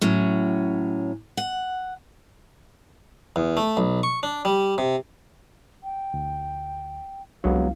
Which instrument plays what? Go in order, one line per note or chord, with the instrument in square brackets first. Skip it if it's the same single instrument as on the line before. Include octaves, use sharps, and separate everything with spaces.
[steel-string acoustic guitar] A2 F#3 C#4
F#5
[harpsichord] E2
A3
B1
C#6
D4
G3
C3
[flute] G5
[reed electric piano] D2
[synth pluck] G1 C2 [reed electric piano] F#3 G#3 B3 [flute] F5